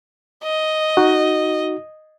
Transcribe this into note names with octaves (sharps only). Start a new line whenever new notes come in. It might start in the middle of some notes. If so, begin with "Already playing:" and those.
D#5
D#4 F#4